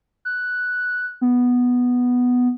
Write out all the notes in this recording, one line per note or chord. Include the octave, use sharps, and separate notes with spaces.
F#6
B3